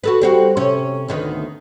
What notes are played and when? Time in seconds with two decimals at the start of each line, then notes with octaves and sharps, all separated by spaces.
0.03 F#4 A4 B4
0.22 G3 C4 F#4
0.57 C3 C#4
1.08 D2 D#3 B3